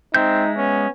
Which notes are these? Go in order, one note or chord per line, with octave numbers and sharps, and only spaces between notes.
G#3 C4 D#4 E5 G6
B3 C#4